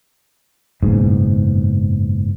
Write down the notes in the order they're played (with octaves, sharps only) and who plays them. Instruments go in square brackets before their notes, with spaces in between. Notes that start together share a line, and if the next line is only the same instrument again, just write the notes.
[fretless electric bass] F#1 G#2 B2